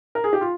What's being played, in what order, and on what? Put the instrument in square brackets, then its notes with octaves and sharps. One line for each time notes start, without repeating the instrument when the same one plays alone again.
[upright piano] A#4
G#4
G4
F4